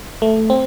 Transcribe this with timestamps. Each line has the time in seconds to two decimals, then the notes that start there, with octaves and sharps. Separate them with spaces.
0.22 A3
0.50 C4